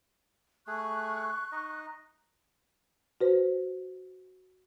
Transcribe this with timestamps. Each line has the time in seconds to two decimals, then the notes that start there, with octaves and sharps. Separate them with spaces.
0.67 A3 G#4 C#6 F#6
1.52 D#4 D#5
3.21 F#4 B4 C5